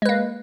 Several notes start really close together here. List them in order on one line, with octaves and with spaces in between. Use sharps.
G#3 B4 A#3